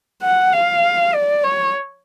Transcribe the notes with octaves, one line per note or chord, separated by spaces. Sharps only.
F#5
F5
D5
C#5